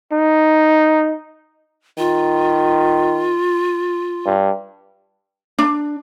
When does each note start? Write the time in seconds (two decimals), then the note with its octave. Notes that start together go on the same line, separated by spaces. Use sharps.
0.12 D#4
1.98 D#3 F4
4.26 G2
5.59 D4